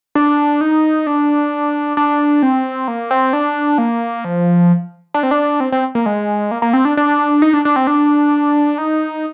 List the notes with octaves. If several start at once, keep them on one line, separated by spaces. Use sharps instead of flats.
D4
D#4
D4
D4
C4
A#3
C4
D4
A#3
F3
D4
C4
D4
C4
C4
A#3
G#3
A#3
A#3
C4
D4
D4
D#4
D4
D4
C4
D4
D#4